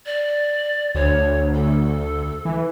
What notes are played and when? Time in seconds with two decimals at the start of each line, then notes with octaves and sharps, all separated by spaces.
0.06 D5
0.95 D2 C#5
1.54 A4
2.45 E3